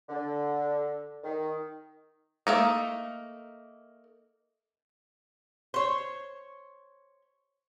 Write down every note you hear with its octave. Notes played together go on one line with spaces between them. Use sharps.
D3
D#3
A3 A#3 D#4
C5 C#5